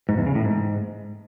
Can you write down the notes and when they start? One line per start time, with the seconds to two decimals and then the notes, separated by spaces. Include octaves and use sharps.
0.09 G#2
0.18 E2
0.26 C#3
0.35 A2
0.44 G#2